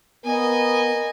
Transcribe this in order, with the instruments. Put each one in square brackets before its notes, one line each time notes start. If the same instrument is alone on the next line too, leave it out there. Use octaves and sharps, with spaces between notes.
[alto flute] B3 [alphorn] A#4 [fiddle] D#5 G#5